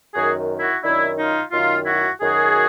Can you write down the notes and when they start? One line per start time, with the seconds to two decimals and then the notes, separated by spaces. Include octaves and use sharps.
0.14 F#2 D#3 F#4 G#4
0.60 E4 F#4
0.83 F#2 D#3 D4 E4
1.18 D#4 F4
1.52 F#2 D#3 D#4 F4
1.86 E4 F#4
2.20 F#2 D#3 F#4 G#4